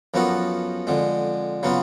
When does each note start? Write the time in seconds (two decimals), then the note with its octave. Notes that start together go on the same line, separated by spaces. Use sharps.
0.14 F#2 F3 B3 F#4 A4
0.87 F2 D3 G#3
1.63 C#3 F#3 B3 F4